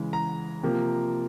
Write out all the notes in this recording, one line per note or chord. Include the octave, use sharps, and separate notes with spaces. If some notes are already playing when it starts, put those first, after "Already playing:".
Already playing: C#3 E3 G#3
A#5
C3 F3 A#3